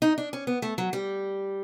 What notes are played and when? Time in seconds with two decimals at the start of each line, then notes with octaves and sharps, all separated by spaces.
0.02 D#4
0.18 D4
0.33 C#4
0.47 B3
0.62 A3
0.78 F#3
0.93 G3